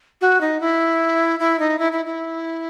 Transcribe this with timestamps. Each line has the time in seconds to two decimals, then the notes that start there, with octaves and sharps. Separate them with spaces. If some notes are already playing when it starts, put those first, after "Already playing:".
0.21 F#4
0.41 D#4
0.60 E4
1.40 E4
1.59 D#4
1.79 E4
1.92 E4
2.06 E4